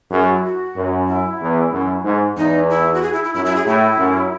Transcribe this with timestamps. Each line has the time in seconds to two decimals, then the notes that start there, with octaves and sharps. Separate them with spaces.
0.11 F#2 G#4
0.22 F#4
0.34 E4
0.44 F#4
0.76 F#2
1.08 E4
1.41 E2
1.73 F#2
2.05 G#2
2.37 E2 D#4
2.70 E4
2.94 F#4
3.02 G#4
3.13 E4
3.24 E4
3.34 F#2 E4
3.45 E4
3.56 G#4
3.66 A2 E4
3.99 F#2